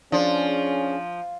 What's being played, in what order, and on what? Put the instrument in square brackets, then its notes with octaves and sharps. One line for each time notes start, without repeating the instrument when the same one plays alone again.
[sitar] F3 [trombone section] C#4 G#4 [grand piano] D4